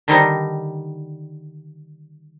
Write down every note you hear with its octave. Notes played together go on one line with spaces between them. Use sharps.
D3 D#3 G3 D#4